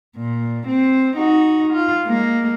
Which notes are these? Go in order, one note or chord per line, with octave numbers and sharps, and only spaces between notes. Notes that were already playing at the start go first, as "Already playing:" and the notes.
A#2
C4
D#4 F#4
F4
G#3 A#3